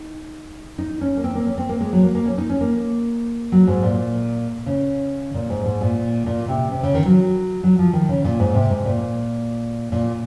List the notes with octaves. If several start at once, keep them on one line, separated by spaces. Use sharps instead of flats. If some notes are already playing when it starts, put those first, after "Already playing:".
Already playing: D#4
D#4
C#4
A#3
C4
A#3
C#4
C4
A#3
G#3
F#3
A#3
A#3
C#4
D#4
C#4
A#3
F#3
G#2
A#2
C#3
A#2
G#2
G#2
A#2
A#2
C3
C3
C#3
D#3
F#3
F#3
F3
D#3
C#3
A#2
G#2
C3
G#2
A#2
A#2